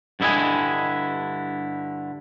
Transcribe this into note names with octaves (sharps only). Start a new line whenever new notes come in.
G2 D3 E4 D#5 G#5